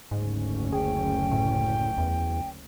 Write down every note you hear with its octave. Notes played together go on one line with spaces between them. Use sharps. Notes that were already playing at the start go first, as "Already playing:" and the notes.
F#1 D2 G#2 C#4
G#4 G5
A2
E2